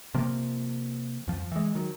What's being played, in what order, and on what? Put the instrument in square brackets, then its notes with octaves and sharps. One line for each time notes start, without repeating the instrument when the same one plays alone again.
[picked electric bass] C3 F3 A#3
F2 F3
E3 G#3
D#3 F#3